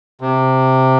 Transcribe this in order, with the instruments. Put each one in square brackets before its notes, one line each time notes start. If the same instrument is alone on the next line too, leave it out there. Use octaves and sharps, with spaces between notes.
[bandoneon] C3